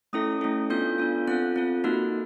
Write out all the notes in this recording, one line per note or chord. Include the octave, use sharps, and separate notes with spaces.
A3 C#4 E4 A4 D#6
A3 C#4 E4 A4
B3 D4 F4 A4 G6
B3 D4 F4 A4
C4 F4 A4 F#6
C4 F4 A4
A#3 D#4 F#4 A4 F#6